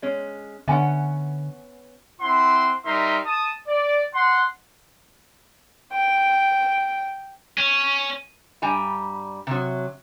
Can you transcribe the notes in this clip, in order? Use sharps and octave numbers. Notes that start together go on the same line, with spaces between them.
G#3 C#4
D3 B3 C#4 E5 F#5 G#5
C4 E4 F#5 C6
G3 D#4 A#4 E5 C6
A5 D#6
D5
F#5 C6
G5
C#4
G2 G3 G#5 A#5
C3 F#3